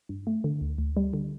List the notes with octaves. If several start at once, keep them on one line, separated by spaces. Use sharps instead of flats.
G2
A3
D3
D2
D2
G3
D3